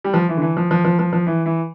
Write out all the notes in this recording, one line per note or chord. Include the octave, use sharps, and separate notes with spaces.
G3
F3
E3
D3
E3
F3
F3
F3
F3
F3
E3
E3